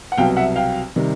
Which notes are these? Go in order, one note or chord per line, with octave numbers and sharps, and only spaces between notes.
F#5
C2 B2 F#3 F5 G5
E5 F#5
F5 G5
C3 D#3 G3